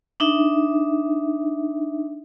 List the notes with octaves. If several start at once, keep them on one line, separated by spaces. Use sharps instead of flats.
D4 D#4 E5